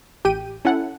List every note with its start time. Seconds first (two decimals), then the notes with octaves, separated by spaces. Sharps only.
0.25 A1 G4 G5 D#7
0.65 C#4 E4 A4 F#5